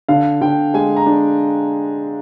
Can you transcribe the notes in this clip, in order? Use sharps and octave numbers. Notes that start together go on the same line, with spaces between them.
D3 F5
D3 G5
G#3 G#5
A#5
D4